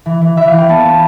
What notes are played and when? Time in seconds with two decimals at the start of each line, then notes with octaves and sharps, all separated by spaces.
0.06 E3
0.21 E3
0.37 E3 E5
0.48 E3 F5
0.58 G5
0.69 B3 A5
0.85 B3